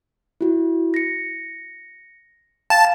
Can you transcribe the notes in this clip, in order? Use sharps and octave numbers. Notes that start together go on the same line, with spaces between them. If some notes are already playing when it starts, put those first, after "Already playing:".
E4 F#4
A#6 C#7
F5 G5 A5